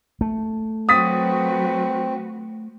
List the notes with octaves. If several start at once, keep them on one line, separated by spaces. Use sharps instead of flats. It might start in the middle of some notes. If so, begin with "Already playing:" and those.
A3
F#3 C4 F#4 B4 D#6 A6 B6